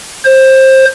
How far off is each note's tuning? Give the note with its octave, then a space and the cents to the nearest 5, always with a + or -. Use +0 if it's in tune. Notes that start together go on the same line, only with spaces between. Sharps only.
C5 +20